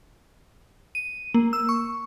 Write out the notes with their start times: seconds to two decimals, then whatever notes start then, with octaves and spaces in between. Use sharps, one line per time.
0.95 D#7
1.34 A#3
1.53 E6
1.69 C#6